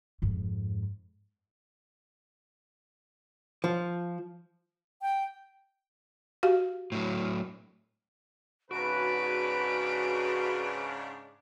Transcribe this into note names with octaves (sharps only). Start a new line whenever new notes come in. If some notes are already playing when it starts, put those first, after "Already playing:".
F2 G#2
F3
G5
F#4 G4 F5
A2 F#3
G#2 C#3 D4 F#4 B4 D7